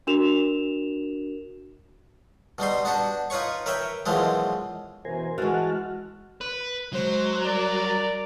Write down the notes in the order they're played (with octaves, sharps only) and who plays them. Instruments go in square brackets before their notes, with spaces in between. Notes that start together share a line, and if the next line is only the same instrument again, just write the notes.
[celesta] D4 F#4 A#4 E7 F7
[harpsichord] B2 G3 D#4 C6
B3 D4 F#4 G4
D#4 F4 B4 C#5 C#6
A#4 B4 C#5 E5 G5
F#2 B2 E3 F3 G#3 G4
[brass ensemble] F#2 B2 E3 [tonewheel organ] A#4 C5 G#5
[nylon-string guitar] E3 G#3 [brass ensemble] F#4 [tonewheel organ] A5 F6 F#6
[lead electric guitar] B4
[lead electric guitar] F#3 [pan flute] G#3 [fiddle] C5
[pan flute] G3 [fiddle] A#4 [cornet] D5